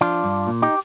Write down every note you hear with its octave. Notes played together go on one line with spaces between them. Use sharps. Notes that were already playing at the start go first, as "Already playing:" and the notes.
F3 D4 F4
G2
A#2
D#4 G4